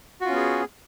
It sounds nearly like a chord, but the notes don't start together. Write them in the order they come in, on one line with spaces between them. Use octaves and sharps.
F#4 F4 C#4 B3 G#4